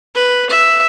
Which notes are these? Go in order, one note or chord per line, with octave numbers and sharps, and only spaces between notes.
B4
E5